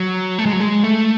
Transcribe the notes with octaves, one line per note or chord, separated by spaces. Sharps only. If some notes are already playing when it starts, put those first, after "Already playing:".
Already playing: F#3
A3
G#3
F#3
G#3
A3